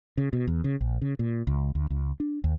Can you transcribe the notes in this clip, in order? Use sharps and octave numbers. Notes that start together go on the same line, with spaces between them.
C#3
B2
E2
C#3
A#1
C#3
A#2
C#2
D2
C#2
D4
D#2